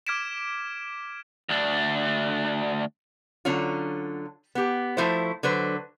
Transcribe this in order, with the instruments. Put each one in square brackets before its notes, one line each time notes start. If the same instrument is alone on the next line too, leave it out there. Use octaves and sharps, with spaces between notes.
[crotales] D6 F6 G#6 B6 D7 E7
[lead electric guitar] D2 D4
[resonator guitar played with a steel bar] D3 F#3 C#4 F4
B3 G4
F3 A3 E4 F#4 C5
D3 F#3 B4 C5